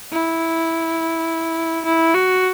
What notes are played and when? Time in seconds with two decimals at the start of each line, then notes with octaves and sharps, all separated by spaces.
0.12 E4
1.85 E4
2.14 F#4